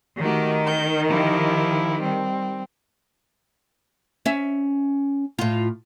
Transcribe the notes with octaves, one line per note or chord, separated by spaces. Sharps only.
D#3 A3 F#4 G4
G6
F3 E4 G4
G3 C4
C#4 E5
A2 F4